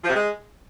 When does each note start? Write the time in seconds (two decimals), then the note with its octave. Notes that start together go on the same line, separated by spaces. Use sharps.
0.04 F3
0.10 C3
0.15 G#3